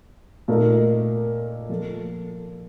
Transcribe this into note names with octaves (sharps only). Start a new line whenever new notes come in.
A#2 A3 D#4 A#4
F3 A#3 F4 A4